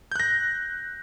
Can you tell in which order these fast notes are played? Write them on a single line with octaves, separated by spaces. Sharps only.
G6 F#6 A#6